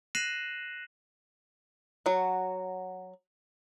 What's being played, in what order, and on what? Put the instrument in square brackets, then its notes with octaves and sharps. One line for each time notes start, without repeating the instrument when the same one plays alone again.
[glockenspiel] F#6 A#6 C7 D#7 E7 F#7
[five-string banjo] F#3 F#4